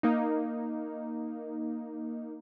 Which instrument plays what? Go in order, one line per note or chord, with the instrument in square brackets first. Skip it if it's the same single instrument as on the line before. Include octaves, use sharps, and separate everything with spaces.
[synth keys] A#3 D#4